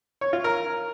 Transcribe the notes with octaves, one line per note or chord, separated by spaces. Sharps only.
C#5
F4
A#4